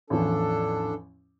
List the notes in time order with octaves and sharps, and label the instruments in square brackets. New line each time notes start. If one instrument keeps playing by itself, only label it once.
[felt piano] A1 E2 F3 [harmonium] D4 A4